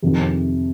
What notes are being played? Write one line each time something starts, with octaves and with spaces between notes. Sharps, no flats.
F2 C3 D#3